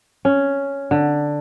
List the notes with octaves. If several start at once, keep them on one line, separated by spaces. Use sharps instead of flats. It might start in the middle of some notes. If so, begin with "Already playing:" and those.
C#4
D3